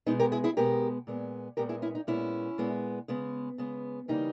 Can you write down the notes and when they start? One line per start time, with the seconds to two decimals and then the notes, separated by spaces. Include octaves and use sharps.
0.06 B2 G#3 B3 D#4
0.20 G4 A#4
0.32 E4 G#4
0.44 E4 G#4
0.57 B2 G#3 B3 G4 A#4
1.07 A#2 G#3 B3
1.57 A#2 G#3 B3 G4 A#4
1.69 E4 G#4
1.82 C#4 E4
1.95 D#4
2.07 A#2 G#3 B3 C#4 E4
2.58 A#2 G#3 B3
3.08 C#3 G#3 B3
3.58 C#3 G#3 B3
4.08 C#3 E3 G3 A#3 D#4 G4